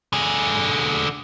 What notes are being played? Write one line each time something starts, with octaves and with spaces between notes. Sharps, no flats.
D3 G#4